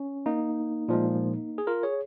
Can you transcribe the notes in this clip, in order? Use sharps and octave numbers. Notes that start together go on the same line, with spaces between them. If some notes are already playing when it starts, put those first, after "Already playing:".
Already playing: C#4
A#3 D#4
A#2 F3 G#3
G#4
F4 A#4
G#4 C#5